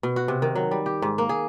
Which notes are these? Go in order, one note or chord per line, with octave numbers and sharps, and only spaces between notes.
B2
F#4
C3
D#3
F#3
G3
G4
G#2
A#3
G#4